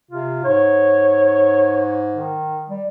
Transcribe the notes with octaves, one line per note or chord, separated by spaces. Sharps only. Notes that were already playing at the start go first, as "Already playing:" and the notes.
C3 F4
G#2 C#5
D#3
G3